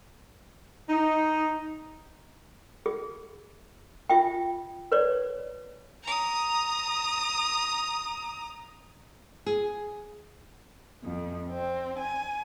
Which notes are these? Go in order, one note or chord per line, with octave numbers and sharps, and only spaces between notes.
D#4
G#4
F4 E5 G5
B4 C#5 D5
A#5 D#6
G#4
F2
C4
G#5